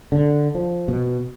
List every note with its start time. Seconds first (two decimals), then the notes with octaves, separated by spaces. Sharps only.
0.12 D3
0.55 F3
0.88 B2